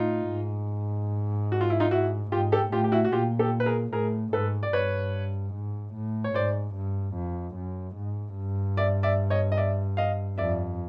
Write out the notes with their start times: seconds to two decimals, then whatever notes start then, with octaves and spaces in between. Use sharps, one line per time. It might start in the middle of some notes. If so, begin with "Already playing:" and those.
Already playing: A2 D#4 F4
0.30 G#2
1.52 F#4
1.61 F4
1.70 E4
1.80 D#4 F4
1.91 E4 F#4
2.32 G#2 F4 G4
2.52 G4 A4
2.72 A2 F4 G4
2.84 G4
2.92 E4 F#4
3.05 F#4
3.12 A#2 F4 G4
3.39 G4 A4
3.60 B4
3.66 G#4 A#4
3.93 A2 G#4 A#4
4.33 G#2 A4 B4
4.63 D5
4.73 G2 B4 C#5
5.54 G#2
5.94 A2
6.24 C#5
6.34 G#2 C5 D5
6.75 G2
7.16 F2
7.56 F#2
7.96 G#2
8.36 G2
8.77 D5 E5
9.03 D5 E5
9.30 C#5 D#5
9.52 D#5
9.57 D5 E5
9.97 D#5 F5
10.38 F2 D5 E5